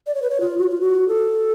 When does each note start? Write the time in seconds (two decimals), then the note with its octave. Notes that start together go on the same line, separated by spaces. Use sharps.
0.07 D5
0.15 C#5
0.22 B4
0.30 C#5
0.41 F4
0.58 F#4
0.70 F4
0.81 F#4
1.08 A4